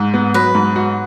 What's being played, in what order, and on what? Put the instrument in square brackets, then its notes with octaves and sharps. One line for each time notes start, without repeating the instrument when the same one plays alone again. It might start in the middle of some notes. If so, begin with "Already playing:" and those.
Already playing: [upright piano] G#2
B3
[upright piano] F#3 [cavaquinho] B4 D#5
[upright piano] G#2
F#4